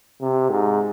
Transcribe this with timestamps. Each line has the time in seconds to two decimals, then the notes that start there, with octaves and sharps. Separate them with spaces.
0.21 C3
0.50 G#2